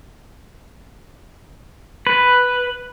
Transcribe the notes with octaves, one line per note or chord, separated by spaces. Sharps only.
B4